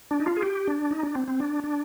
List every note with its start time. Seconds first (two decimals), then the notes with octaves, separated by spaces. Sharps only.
0.11 D4
0.20 D#4
0.26 F4
0.37 G#4
0.42 G4
0.68 D4
0.91 D#4
1.03 D4
1.15 C4
1.28 C4
1.40 D4
1.64 D4